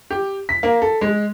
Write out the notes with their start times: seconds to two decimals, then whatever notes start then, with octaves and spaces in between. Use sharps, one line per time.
0.11 G4
0.49 B6
0.63 A#3
0.82 A4
1.01 G#3